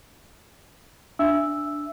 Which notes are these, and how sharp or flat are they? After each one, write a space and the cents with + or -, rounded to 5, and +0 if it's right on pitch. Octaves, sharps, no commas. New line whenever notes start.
D4 +0 E5 +15 E6 +0